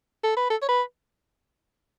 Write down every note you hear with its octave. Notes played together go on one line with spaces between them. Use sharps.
A4
B4
A4
C#5
B4